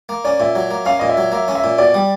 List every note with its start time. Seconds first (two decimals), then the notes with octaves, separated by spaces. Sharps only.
0.09 A#3
0.24 C#4 D5
0.40 A#2 E5
0.55 F#3
0.71 A#3
0.86 C#4 F5
0.99 A#2 D#5
1.09 E5
1.17 F#3
1.32 A#3 E5
1.48 C#4
1.55 E5
1.64 A#2
1.78 B2 D5
1.94 G3